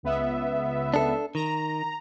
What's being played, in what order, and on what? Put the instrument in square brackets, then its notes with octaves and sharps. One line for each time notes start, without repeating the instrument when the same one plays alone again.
[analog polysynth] C#2 B3 E5
[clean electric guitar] D4 A4
[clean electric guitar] D#3 [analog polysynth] A#5